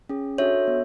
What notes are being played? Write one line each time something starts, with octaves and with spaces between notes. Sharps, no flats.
C#4 G#4
D4 F#4 A4 C#5 E5
B3